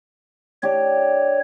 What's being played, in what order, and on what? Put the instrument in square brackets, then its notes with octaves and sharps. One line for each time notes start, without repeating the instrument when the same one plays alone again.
[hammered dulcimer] D4 G4 [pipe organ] C#5